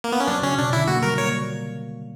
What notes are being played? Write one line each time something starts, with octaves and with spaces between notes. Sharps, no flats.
A#3
B3
C#4
F#3 D4
C#3 C#4
B2 D4
D3 E4
F#3 A#3 F#4
G3 A#4
F#3 A#3 C#5